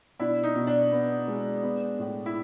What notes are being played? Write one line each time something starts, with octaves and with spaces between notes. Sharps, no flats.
B2 D4 E4
D#4
B2
D4
B3
G#3
B3
A2
E4